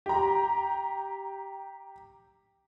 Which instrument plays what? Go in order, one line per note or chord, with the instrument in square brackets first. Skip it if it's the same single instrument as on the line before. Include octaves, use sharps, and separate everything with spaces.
[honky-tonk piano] G4 A#5